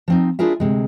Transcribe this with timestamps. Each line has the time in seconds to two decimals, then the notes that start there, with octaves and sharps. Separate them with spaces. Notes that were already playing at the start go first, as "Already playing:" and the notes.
0.08 F3 C4 D#4
0.39 D4 E4 F4 G#4 A#4 E5
0.60 D2 C3 G#3